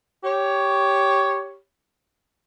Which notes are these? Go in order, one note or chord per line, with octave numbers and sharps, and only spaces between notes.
G4 C#5